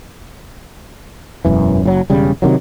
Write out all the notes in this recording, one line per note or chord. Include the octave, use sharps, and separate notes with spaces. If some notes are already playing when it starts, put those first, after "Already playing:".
E1 F#2 E3
F#1 A2 F#3
E1 C#3 G3
C3 D#3 F#3